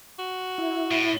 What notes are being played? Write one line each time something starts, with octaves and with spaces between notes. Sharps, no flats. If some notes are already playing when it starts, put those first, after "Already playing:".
F#4
E4
A2